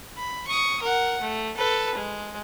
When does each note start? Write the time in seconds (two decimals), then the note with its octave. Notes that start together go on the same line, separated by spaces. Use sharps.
0.17 B5
0.48 C#6 D#6
0.82 A#4 F#5
1.22 A3
1.57 A4 B4
1.95 G#3